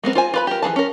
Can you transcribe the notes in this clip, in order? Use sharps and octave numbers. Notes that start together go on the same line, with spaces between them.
G#3 B3 C4 A#4
F4 C5 G#5
F4 B4 B5
G4 A#4
E3 A3 G#4 A5
C#4 A#4